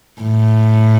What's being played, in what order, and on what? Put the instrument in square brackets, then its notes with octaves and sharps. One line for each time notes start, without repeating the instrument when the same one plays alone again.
[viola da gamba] A2